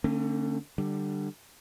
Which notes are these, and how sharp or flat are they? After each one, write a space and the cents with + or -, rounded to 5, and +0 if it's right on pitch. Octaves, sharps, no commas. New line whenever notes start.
D3 +0 A3 +40 C#4 -40
D3 +20 G3 +0